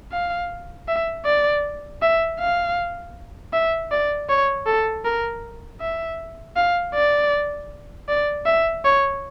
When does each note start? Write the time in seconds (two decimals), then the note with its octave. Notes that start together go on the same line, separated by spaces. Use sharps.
0.12 F5
0.88 E5
1.25 D5
2.02 E5
2.39 F5
3.53 E5
3.92 D5
4.29 C#5
4.66 A4
5.05 A#4
5.81 E5
6.56 F5
6.94 D5
8.09 D5
8.46 E5
8.85 C#5